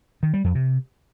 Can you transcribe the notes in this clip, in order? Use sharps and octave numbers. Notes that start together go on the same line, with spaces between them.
D#3
G3
F2
C3